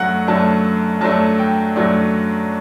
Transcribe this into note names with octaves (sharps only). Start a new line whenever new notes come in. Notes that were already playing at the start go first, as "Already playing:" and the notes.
Already playing: F#2 F#3 A3 D4 F#5
F#2 F#3 A3 D4 A5
F#2 F#3 A3 D4 A5
G5
F#2 F#3 A3 D4